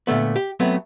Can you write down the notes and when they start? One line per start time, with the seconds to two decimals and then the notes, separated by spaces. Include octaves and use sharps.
0.07 A#2 D3 A3 B3
0.36 G4
0.60 F#3 A3 B3 C4